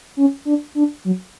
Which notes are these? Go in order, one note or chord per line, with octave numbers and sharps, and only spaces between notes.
C#4
D4
D4
F#3